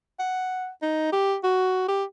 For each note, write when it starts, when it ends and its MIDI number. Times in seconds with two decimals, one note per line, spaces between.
0.19 0.69 78
0.82 1.12 63
1.12 1.36 67
1.44 1.84 66
1.88 2.04 67